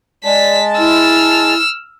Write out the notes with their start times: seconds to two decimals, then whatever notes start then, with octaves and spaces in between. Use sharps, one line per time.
0.25 G#3 D5 A5 B6
0.78 E4 E6 F6